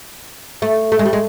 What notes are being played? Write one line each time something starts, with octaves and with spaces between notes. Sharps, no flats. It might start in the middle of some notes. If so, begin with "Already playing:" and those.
A3
A3
G#3
G3
G#3